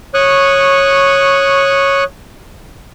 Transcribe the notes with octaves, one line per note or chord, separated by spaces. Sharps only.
C#5 C#6 D#6 F#6